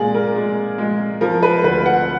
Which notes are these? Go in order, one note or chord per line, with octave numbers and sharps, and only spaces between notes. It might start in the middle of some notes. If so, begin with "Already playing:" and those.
Already playing: A#2 G#3 G#4 D5
A#4
G#3
G#3
F3 A#4
B4
D2 B4
F#5